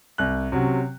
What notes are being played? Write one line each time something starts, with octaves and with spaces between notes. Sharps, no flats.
C2 F#6
C3 F#3 C#4